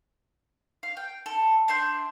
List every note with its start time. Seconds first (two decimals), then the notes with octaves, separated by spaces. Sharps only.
0.83 F5
0.97 G5
1.26 A4
1.68 D4 E5 C6 G6